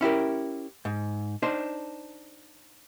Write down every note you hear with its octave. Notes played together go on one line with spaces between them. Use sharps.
C#4 E4 G4 A#4
G#2
D4 D#4 C5